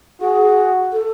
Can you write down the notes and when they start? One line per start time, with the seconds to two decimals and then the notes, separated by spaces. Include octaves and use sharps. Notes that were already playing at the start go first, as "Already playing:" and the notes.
0.21 F#4 G#4
0.93 A4